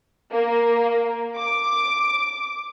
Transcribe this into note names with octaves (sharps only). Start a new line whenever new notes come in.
A#3
D6